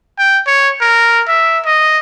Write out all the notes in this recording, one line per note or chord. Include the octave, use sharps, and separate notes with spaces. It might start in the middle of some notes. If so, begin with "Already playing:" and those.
G5
C#5
A#4
E5
D#5